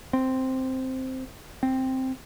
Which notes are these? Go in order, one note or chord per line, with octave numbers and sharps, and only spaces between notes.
C4
C4